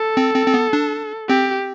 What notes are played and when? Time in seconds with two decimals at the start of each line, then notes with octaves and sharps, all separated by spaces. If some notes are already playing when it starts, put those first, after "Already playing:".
Already playing: A4
0.17 C4
0.35 C4
0.46 C4
0.54 B3
0.73 D4
1.29 C4 G4